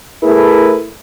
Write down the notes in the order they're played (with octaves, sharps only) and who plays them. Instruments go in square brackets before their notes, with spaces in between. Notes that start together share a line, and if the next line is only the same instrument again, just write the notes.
[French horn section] A3 E4 G#4 A#4 B4